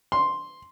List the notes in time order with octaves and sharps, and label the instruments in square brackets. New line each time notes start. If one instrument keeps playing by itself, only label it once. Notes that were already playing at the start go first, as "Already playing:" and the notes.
[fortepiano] C6